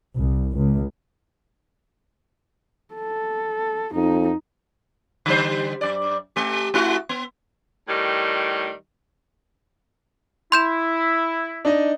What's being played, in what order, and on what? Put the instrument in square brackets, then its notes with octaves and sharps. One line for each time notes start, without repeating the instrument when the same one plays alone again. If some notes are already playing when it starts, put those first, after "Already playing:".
[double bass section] C2
C#2
[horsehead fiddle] A4
[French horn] F2 [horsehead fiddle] D#4
[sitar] D3 G3 C5
F#2 D5
A3 G4
A3 E4 F#4
B3
[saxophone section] A2 D#3 G3
[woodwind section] E4 [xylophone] C6 G6 E7
[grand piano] D4 D#4 D#5